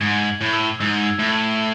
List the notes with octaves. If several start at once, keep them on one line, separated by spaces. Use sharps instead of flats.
G#2 G#6
F#7
A2
E6
G#2 E6
G#6
A2
F#7